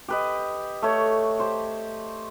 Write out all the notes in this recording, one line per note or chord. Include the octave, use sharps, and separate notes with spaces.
G4 B4 D#5
A3 C#5
G4 C5